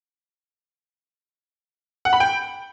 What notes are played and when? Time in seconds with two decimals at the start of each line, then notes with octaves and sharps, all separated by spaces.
2.05 F#5
2.13 B5
2.20 G5